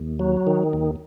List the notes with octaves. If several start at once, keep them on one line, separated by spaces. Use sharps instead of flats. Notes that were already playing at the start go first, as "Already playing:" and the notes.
Already playing: D#2
F#3
D#3
D#2